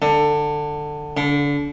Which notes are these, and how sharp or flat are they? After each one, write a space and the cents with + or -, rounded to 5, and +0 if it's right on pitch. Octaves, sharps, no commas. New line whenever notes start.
D3 +15
D3 -30